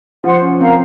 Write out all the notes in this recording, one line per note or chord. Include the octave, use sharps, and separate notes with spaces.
F3 C5 F#5 C6
C#4
C4 A#4 F5 A#5